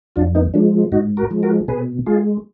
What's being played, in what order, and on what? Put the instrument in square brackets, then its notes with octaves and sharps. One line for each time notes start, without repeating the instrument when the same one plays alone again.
[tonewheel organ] F2 D4 F4
B3 D#4
F3 G#3 D4
G#2 D#4 F#4
F#4 A#4
F3 G#3
F#4 A#4
B2 G#4 B4
G#3 F4 G#4